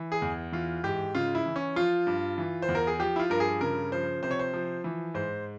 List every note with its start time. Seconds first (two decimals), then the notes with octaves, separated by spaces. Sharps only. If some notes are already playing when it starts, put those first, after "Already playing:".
Already playing: E3
0.12 G#4
0.22 E2
0.52 E3 F4
0.84 G#2 G4
1.14 C#3 F4
1.35 E4
1.46 E3
1.56 C#4
1.76 F3 F4
2.07 G2
2.38 E3
2.62 C5
2.68 E2
2.75 A#4
2.87 G#4
2.99 F3 G4
3.16 E4
3.20 F4
3.30 G2 A#4
3.40 G#4
3.61 C#3 A#4
3.92 F3 C5
4.23 C3 C5
4.31 C#5
4.39 C5
4.54 F3
4.84 E3
5.14 G#2 C5